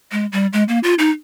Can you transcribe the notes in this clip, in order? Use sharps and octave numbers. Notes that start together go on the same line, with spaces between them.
G#3
G3
G#3
A#3
F4
D#4